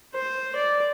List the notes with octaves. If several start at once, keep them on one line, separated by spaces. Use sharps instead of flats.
C5
D5